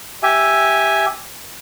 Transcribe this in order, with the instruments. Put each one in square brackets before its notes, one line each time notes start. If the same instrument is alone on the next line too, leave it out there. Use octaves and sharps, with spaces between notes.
[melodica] G4 E5 G#5